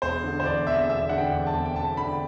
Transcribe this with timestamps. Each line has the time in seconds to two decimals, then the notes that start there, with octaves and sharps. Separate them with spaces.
0.02 E1 C5
0.24 D3
0.40 C5
0.45 E2 D5
0.67 E1 E5
0.89 E1 E5
1.09 D3 F#5
1.18 G5
1.32 E2
1.47 A5
1.54 E1
1.65 G5
1.75 E1 A5
1.97 D3 B5